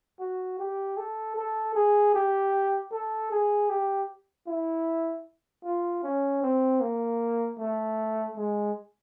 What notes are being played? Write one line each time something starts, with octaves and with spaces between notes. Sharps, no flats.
F#4
G4
A4
A4
G#4
G4
A4
G#4
G4
E4
F4
C#4
C4
A#3
A3
G#3